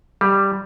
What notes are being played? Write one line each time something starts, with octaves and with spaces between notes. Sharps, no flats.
G3